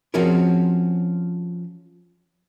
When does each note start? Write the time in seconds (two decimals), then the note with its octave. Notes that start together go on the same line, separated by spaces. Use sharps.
0.14 F3 C4 C#4 F#4 G#4 A#4